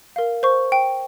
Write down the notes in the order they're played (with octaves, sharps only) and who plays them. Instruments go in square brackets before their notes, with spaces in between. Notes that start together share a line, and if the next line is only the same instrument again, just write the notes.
[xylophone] A#4 F5
C5 C#6
G5